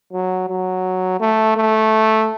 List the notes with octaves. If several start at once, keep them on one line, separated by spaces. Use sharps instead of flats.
F#3
F#3
A3
A3